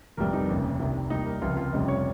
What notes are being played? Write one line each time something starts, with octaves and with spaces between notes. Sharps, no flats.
G1 F2 C3 G3 A#4
D#4
F1 D#2 C#3
C2 C3 D#3
D#2 D#3 G3 D#4
A#4
C#2 C3 F3 F4
F4
F1 F2 C#3 G3 D#5
C#5